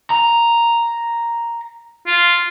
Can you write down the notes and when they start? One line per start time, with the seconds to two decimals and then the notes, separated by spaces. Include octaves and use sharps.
0.10 A#5
2.07 F4